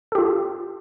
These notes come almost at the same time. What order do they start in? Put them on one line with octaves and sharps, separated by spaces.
A4 G4 F4